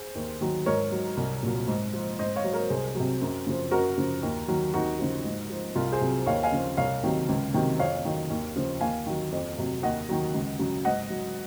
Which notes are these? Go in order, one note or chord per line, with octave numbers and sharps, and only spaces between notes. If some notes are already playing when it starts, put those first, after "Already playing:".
Already playing: G#4 C5
D#2
D#3 F#3
G#2 A#4 C#5
F#3
C2
A#2 F#3
G#2
F3
G#2 C5 D#5
C#5 F5
F#3
A#4 C#5
C2 G#4 C5
C3 F#3
F#2
C#3 F3
F#2 F#4 A#4
C#3 F3
D#2
D#3 F#3
D#2 D#4 F#4
C#3 F3
G#2
F3
C2 F4
G#4 C5
C3 F#3
D#2 C#5 F5
F5 G#5
C#3 F3
C2 C#5 F5
C3 D#3 F#3
C#2
C3 D#3 F#3
F2 C#5 F5
D#3 F#3
D#2
C#3 F3
D#2 F5 G#5
D#3 F#3
F2
C3 F#3
D#2 D#5 F#5
D#3 F#3
C#2
C#3 F#3
G#2 D#5 F#5
F#3